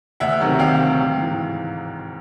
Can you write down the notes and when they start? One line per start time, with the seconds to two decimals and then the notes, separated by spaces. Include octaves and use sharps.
0.20 D2 E5 F#5
0.40 C3 D#3 F#3
0.59 D2 F5 G5
0.79 C3 D#3 F#3
0.98 A1
1.17 G#2 E3